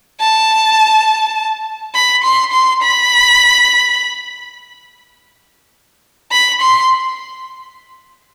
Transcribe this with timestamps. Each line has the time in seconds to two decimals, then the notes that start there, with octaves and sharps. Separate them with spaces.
0.21 A5
1.95 B5
2.24 C6
2.53 C6
2.82 B5
6.32 B5
6.61 C6